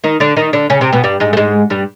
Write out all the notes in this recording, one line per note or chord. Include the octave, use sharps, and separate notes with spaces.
D#3 D#4
D3 D4
D#3 D#4
D3 D4
C#3 C#4
C3 C4
B2 B3
G2 G3
G#2 G#3
A3
G#2 G#3
G2 G3